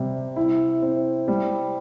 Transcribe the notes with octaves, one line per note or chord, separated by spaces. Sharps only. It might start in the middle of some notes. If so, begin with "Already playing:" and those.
Already playing: C3 G3
E4
C4
G3